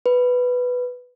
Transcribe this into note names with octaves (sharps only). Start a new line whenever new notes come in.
B4